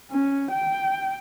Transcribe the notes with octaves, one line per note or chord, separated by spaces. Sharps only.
C#4
G5